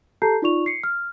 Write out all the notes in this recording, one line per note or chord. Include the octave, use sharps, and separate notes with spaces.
G4 A4 A5 A#5 G6 C7
D#4 F4 D5 C#6 F7
C7 C#7
F6